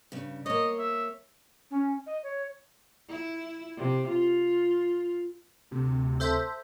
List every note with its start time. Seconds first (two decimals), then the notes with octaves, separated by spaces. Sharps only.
0.12 G2 C#3
0.46 A#3 C#5 D#5
0.79 E5
1.71 C#4
2.06 D#5
2.23 C#5
3.09 E4
3.77 C3
4.08 F4
5.71 D2 C3
6.20 A4 C5 E5